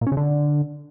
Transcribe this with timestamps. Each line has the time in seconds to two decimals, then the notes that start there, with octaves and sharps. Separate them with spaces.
0.01 A#2
0.07 C#4
0.12 C#3
0.17 D3